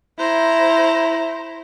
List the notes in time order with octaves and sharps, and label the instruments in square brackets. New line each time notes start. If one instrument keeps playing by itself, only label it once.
[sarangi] E4 [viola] C5 A#5